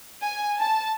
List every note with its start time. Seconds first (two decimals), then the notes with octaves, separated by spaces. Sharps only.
0.23 G#5
0.60 A5